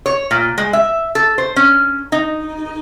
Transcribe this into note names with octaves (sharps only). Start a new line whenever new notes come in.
C#5
A#2
G#3
E5
A4
C5
C#4
D#4